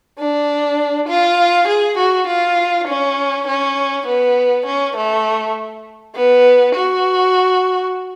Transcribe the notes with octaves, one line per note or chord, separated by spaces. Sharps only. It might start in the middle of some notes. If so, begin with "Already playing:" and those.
D4
F4
G#4
F#4
F4
C#4
C#4
B3
C#4
A3
B3
F#4